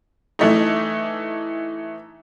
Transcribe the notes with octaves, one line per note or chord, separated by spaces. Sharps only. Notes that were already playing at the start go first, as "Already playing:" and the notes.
E3 A3 D#4